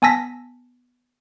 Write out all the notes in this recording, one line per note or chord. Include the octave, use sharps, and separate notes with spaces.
B3 G#5 A5 E6 A#6 B6